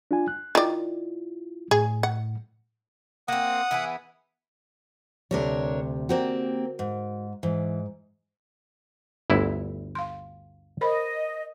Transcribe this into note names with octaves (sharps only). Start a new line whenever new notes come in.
D4 F4 G#5
F#6
D#3 E4 F4 D5
A2 G#4
F#5
A#3 C4 F#5 D#6
E3 B3 G#4
D2 C3 G3 D4 A#4 C#5
A#3 C4 F#4 G4 A#4 D5
G#2
G#2 E3
G1 D2 E4
F5 C6
A#4 C5 D#5 B5